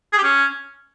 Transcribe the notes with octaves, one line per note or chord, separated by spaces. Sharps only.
G#4
G4
C#4